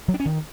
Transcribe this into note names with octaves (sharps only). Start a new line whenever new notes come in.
F#3
D4
C#4
D#3